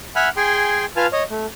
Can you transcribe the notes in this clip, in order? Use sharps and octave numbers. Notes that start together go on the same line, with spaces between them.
E5 F#5 G#5 B5 F6 F#6
G#4 G5 G#5 C6
F4 B4 F5 G#5 A5 F6
C#5 D#5
A3